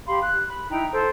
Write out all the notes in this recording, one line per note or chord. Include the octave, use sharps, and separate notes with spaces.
G4 F5 B5 C6
F#6
B5
D#4 E4 G5 A#5
A4 C5